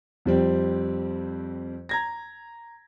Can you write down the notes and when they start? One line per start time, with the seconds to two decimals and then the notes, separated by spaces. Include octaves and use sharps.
0.25 F2 G3 C4
1.89 A#5 G#6 A#6